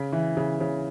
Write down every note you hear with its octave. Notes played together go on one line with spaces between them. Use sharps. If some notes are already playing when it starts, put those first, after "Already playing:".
Already playing: C#3
E3
C#3
C#3